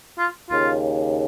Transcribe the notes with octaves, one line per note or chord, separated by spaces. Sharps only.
F4
D#2 C#3 F4